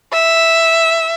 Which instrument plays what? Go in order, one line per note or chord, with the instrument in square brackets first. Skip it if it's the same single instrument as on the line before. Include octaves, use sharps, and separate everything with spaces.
[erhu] E5